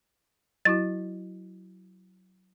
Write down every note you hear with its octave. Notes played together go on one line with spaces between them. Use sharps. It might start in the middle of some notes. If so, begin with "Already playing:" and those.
F#3 E4 F#4 A6